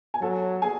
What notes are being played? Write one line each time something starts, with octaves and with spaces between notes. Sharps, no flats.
G#5
F#3 A4 A5
G#4 G#5